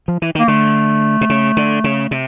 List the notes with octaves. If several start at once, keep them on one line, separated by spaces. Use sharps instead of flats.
F3
E3
D#3 A#3
D3 A3
C3
C#3
D3
C#3
C3